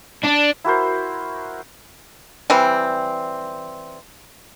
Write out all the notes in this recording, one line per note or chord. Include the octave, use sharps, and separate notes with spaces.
D4
E4 F#4 A#4 C5
E3 G3 C4